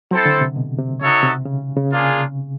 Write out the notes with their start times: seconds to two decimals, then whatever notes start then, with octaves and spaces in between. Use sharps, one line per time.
0.11 F#3 C4 E4 A4 C5
0.26 D3
0.41 C3
0.56 B2
0.78 C3
1.01 C#3 D#4 F#4 A4 C#5 E5
1.23 C3
1.46 C#3
1.76 C#3
1.92 A#3 D4 F4 G#4